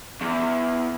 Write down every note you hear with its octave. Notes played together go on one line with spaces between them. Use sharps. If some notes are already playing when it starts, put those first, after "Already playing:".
E2